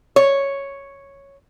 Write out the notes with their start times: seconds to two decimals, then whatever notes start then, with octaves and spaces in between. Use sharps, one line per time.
0.16 C#5